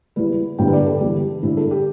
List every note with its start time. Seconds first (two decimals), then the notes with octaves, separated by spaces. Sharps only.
0.16 E2 E3 G3 B4
0.58 G1 G2 D3 G3 G5
0.68 B4
0.73 D5
0.80 G4
0.87 A4
1.00 E2 D3 G3 G4
1.43 G1 G2 G3 E4
1.57 A4
1.71 G4